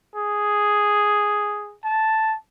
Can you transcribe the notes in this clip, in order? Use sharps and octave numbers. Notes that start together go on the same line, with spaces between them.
G#4
A5